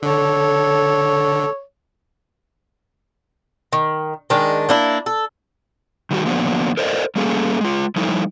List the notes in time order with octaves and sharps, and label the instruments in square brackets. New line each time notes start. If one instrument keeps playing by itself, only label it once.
[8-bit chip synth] D3 [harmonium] A4 [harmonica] C#5
[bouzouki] D#3
D#3 G#3 D4
A#3 D4 E4
A4
[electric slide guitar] D#3 G3 F#4
D3 F3 F#3 A#3 B3 D4
A4 A#4 C5 D5 D#5
G3 A3 A#3 C#4 G#4 A4
G#3 F4
F3 G3 A3 D#4 E4